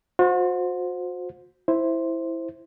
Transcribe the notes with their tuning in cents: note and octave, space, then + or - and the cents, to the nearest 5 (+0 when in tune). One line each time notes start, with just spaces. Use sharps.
F#4 -40 C5 +0
E4 +0 C5 +0